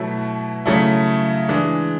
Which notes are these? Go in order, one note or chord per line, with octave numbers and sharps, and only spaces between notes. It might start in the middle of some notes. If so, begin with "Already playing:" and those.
Already playing: B2 F#3 A3 E4
C#3 F#3 A3 E4
E3 G#3 D4